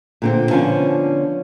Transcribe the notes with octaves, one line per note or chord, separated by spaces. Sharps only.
A#2 D3 C4
D3 F3 B3 C#4 D4